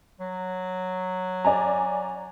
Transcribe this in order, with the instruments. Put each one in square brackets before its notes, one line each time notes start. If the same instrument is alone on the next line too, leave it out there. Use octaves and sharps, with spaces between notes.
[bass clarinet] F#3
[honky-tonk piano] D5 G#5 A#5